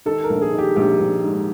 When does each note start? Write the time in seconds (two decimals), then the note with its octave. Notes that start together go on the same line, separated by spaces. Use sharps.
0.06 D#3 A4
0.24 A#4
0.30 A#1
0.42 G#4
0.53 D#3
0.58 G4
0.76 A#1 G4
1.00 A#1
1.24 G#2